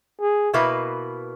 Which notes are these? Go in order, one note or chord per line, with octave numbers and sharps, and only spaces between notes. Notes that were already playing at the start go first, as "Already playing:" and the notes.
G#4
B2 A#3 E4 B4